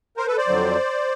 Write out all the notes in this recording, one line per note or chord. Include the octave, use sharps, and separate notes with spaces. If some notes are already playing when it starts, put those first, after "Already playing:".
A#4 C5
A4 B4
C5 D5
F2 D3 F#3